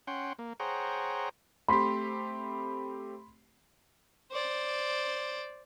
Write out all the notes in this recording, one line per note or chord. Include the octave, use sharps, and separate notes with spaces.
C#4 F#5 G5 C6
A#3
G#4 C5 C#5 F#5 G5 A#5
A3 C4 G4 B5 C6 B6
C5 D5